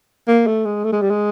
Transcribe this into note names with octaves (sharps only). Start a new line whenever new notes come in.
A#3
A3
G#3
A3
G#3
G3
G#3